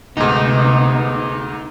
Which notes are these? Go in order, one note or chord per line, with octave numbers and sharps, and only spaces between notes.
D2 G#2 C3 B3 D#4